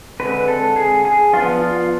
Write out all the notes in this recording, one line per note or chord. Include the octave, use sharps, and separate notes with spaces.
D3 G#3 C4 B4
A4
G#4
G#4
F3 B3 D4 F4
F4